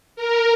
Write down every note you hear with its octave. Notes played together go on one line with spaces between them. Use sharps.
A#4